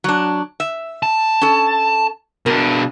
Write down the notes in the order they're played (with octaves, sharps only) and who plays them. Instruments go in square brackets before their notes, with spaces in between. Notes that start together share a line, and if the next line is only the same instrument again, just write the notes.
[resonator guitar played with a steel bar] F#3 D4
E5
[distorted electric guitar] A5
[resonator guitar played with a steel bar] C#4 A4
[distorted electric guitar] B2 D4 [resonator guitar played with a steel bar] A#4